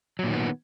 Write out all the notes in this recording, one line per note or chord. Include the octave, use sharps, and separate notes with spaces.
A#2 D#3 F#3 B3